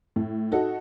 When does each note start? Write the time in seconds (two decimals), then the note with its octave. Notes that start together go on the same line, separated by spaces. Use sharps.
0.16 A2
0.52 D#4 F#4 A4